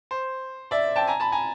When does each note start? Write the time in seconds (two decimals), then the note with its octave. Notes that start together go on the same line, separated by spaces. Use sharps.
0.11 C5
0.71 D5 E5
0.96 G5 A5
1.07 G#5 A#5
1.20 A5 B5
1.32 G#5 A#5